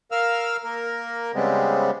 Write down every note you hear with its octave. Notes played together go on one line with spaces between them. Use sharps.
A#4 F5 E6 F6
A#3 A#4
C#3 G3 G#3 B3 C4